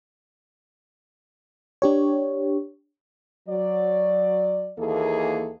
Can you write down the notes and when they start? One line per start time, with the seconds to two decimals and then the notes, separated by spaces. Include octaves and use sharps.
1.82 D4 G4 C#5
3.48 F#3 D5
4.78 D#2 E3 A#3 G#4 A4